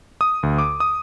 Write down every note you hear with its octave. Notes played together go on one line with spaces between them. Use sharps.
D#6
D2
D6
D#6